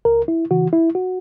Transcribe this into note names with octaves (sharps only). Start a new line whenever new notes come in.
C#2 A#4
E4
C#3 E3 F#4
E4
F#4